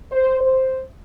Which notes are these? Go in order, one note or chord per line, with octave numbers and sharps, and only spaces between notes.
C5
C5